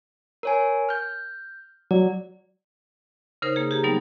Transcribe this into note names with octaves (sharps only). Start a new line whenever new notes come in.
A#4 C#5 G#5
F6 G6
F#3 D5
C#3 D#4 A#4 C5 D#6
A#3 G#4
G4 G#4 A#5
F#3 G3 B3 D#4